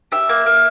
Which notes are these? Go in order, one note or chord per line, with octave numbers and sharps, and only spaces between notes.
G4 E5
A#3
A#3